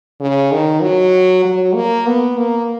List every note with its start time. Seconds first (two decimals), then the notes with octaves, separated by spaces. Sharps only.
0.20 C#3
0.52 D#3
0.82 F#3
1.45 F#3
1.75 A#3
2.07 B3
2.38 A#3